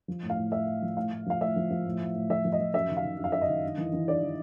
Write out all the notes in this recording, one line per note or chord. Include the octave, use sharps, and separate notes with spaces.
F3
A2
F5
A2
A2 E5
A2
F3
A2 F5
A2
F3 F5
A2 E5
F3
F3
A2
A2
A2
F3 E5
F3
D#5
F3
F#2 E5
D#3
F5
D#3
F#2
F5
F#2 E5
D#5
D#3
G2
E3
E3
G2 D5
E3